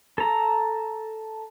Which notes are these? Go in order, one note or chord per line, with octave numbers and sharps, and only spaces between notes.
A4 A#5